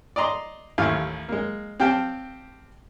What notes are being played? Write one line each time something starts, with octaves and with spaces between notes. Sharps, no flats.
D5 D#5 A#5 C6
A1 D#2 A3 F5
G#3 A#3
C4 G4 F5 G5 A5